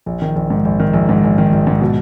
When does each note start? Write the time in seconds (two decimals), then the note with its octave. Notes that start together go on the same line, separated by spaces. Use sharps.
0.06 A#1
0.22 D#3
0.36 A#1
0.50 G#2
0.65 A#1
0.80 D#3
0.93 A#1
1.09 G#2
1.24 A#1
1.38 D#3
1.52 A#1
1.67 G#2
1.81 B2